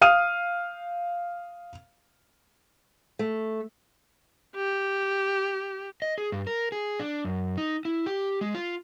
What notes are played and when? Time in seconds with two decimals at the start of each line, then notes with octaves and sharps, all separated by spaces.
0.02 F5 D#6 F6 D#7
3.19 A3
4.56 G4
6.02 D#5
6.18 G#4
6.32 G2
6.47 A#4
6.72 G#4
6.99 D4
7.25 F#2
7.58 D#4
7.85 E4
8.06 G4
8.41 G#3
8.55 F4